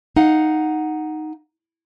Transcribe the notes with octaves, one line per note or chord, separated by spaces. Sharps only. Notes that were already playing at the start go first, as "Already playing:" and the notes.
D#4 F5 F#5